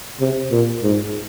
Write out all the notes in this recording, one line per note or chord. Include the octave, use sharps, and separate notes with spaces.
C3
A#2
G#2